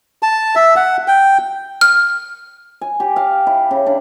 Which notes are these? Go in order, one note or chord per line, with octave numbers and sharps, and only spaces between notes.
A5
E5
F#5
G5
F6
G#5
G4
F5
E4
C#3
D4